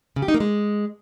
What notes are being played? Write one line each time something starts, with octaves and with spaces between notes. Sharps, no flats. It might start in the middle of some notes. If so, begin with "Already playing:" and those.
C#3
G4
D#4
A#3
G#3